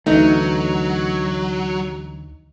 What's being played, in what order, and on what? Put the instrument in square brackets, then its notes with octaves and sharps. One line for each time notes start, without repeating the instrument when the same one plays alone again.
[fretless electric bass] D2 E3 A3 [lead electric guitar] F#3 [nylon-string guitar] D#4